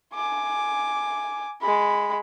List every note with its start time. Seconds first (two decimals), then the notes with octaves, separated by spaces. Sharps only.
0.15 G#5 D6
1.61 G#3 B5